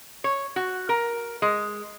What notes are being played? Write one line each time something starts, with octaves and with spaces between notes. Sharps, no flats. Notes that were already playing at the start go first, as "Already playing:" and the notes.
C#5
F#4
A#4
G#3